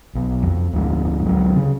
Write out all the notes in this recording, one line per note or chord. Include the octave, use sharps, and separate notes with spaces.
B1
F2
D2 F3 G#3
C#2 F#3 C4
C#3